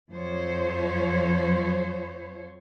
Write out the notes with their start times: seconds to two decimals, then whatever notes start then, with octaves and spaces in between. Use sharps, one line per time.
0.11 F2 F3 F#3 C5 C#5